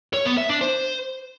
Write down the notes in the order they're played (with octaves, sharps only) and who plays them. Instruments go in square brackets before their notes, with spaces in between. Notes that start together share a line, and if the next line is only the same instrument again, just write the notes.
[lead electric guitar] C#5
B3
E5
D4
C5